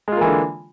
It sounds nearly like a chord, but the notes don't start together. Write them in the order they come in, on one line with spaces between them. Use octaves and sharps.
G#3 F4 A#3 E3 D3